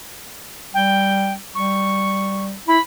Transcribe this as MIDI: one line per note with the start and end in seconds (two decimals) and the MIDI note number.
0.74 1.37 55
0.74 1.33 79
1.55 2.54 55
1.55 2.44 85
2.68 2.78 64
2.68 2.80 83